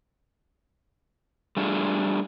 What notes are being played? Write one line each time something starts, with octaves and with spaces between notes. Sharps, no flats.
G3 A3 D4 F4 F#4 G#4